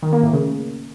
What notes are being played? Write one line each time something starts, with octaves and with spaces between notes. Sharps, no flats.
D#3
A#3
A2
C#3